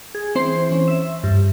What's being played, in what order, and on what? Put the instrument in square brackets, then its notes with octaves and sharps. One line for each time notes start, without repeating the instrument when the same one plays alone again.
[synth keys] G#4
E3 C4 C5 C6
E3 C#4
E5
G2